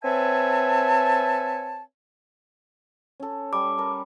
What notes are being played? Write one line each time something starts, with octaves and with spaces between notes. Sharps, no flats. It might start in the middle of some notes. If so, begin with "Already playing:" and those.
C4 B4 C#5 E5 G#5 A5
C#4 A4
G3 D6
A#4 A5